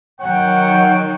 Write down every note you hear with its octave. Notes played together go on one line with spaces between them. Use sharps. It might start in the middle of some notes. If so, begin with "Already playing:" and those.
D#3 F#3 C#5 F#5 G5